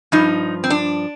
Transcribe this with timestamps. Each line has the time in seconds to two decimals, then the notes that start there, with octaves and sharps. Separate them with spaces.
0.12 G2 F3 D#4
0.64 C4
0.70 D4